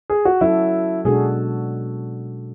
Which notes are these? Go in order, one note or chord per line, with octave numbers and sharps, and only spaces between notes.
G#4
F#4
F#3 C#4 E4 F#4 A4
B2 G#3 D4 F#4 G#4 A4